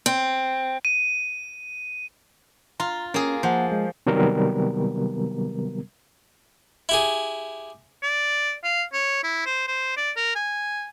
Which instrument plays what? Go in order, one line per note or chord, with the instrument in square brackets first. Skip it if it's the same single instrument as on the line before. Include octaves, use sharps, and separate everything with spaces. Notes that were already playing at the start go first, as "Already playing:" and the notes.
[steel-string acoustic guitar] C4
[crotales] D#7
[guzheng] F4 [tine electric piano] A#5
[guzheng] A#3 G#4 [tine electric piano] C#4
[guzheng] F3 [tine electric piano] A#3 F#5
[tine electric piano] G#3
[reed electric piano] C3 D#3 F#3 G3 B3 A#4
[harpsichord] E4 G4 G#4
[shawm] D5
F5
C#5
E4
C5
C5
D5
A#4
G#5